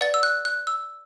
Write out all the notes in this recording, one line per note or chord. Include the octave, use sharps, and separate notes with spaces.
B4 D5 F#5 A6
E6
F#6
F#6
E6